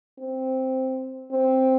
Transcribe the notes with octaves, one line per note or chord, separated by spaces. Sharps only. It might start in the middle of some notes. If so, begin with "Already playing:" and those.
C4
C4